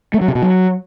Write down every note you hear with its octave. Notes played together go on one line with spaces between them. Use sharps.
A3
F#3
C3
B2
F#3